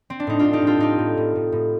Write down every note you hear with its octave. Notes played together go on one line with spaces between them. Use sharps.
C4
D4
A2 D#4
A2 D4 F4
D#4 G4
A2
F4 A4
A2 D#4 G4
A2
A2
A2
A2